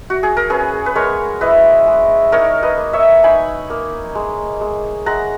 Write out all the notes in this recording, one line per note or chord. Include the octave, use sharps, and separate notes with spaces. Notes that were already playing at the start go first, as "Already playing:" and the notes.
F#4
G#4
A#4
C#4 G#4 B4
B4
G#3 A#4 C#5
E4 B4 D#5
G#3
D#4 A#4 C#5
B4 D#5
A#3
C#5 E5
D#4 G#5 B5
A#3
G#3
G#3
G#3 F#5 A#5